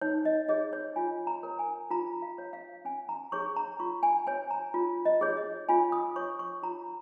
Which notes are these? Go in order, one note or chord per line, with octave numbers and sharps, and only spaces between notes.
D#4 C#5
D#5
G#4 C#5 D#5
C#5
F4 G#5
A#5
A#4 C#5
G#5
F4 A#5
F5
C#5
F5
C#4 G#5
A#5
G#4 C#5 C#6
A#5
F4 C#6
G#5
C#5 G#5
A#5
F4
D#5
G#4 C#5
D#5
F4 G#5
D#6
C#5 C#6
C#6
F4 A#5